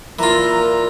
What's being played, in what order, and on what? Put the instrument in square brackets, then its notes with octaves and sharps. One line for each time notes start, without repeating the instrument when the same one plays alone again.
[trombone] A#2 [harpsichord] E3 F4 [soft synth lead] A#5